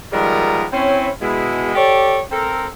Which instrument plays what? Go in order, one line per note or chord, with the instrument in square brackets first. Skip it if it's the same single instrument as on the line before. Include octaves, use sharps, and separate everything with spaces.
[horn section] D#3 F3 G3 G#3 B3 A#4
C4 C#4 E4
B2 G#3 E4
G4 A4 C#5 D5
C4 A4 A#4